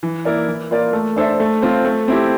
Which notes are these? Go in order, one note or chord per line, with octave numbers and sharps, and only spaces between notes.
E3
A#3 E4 A#4 D5
E3
A#3 F4 A#4 D5
A3
D4 A4 C5 E5
A3
C4 F4 C5
A3
C4 E4 G4